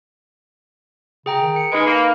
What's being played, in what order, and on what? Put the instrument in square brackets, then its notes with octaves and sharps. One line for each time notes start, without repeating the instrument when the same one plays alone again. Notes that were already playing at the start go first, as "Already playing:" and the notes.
[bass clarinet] C#3 [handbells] G#4 G5 A#5
[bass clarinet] D#3
[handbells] C#7
[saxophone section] G#3 [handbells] D#4 D7 [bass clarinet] B4
[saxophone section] A#3